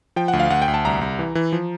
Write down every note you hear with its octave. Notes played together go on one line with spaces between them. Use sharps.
F3 G5
F#5
D2
F5
D2 F#5
G5
D2
A5
C2 A#5
C2
E3
E3
F3